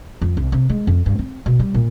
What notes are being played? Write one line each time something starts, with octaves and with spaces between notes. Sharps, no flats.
F2
C2
C3
G#3
F2
G2
C4
B2
G3
A#2